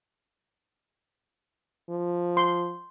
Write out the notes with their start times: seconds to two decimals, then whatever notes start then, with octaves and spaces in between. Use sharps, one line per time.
1.90 F3
2.37 C6